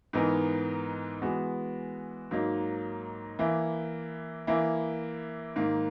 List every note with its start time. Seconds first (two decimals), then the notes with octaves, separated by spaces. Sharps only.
0.13 G#2 E3 B3 D#4 A#4
1.21 E3 G#3 B3 F#4
2.31 G#2 F#3 A#3 D#4
3.39 E3 A#3 E4
4.47 E3 A#3 E4
5.56 G#2 D#3 A#3